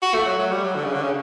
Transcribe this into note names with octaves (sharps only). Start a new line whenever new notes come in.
F#4
A3
F#3
F#3
G3
F#3
D3
C#3
D3
C#3